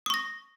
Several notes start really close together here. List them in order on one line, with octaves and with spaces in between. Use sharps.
D#6 C#6 A#6